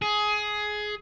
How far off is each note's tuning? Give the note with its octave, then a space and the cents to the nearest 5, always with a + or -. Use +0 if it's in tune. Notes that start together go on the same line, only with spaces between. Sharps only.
G#4 +15